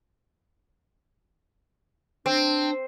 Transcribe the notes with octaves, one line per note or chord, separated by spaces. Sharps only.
C4 D4